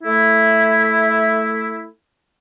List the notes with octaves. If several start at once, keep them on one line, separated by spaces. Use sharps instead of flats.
A3 E4